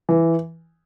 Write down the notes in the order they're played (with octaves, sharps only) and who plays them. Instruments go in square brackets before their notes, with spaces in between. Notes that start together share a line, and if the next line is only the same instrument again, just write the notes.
[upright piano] E3